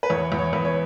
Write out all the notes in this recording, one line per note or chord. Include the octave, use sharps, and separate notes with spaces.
B4
E2 C#5
E2
C#5
E2 B4
C#5